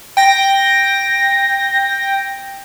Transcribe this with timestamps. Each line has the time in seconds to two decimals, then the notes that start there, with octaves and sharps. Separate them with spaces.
0.17 G5 A#6